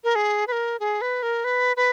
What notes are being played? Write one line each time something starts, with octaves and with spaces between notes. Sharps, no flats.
A#4
G#4
B4
A#4
G#4
B4
A#4
B4
B4